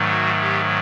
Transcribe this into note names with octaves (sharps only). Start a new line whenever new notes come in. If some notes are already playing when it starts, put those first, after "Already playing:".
Already playing: G#2 D#3 F#3 A3
F#4
G4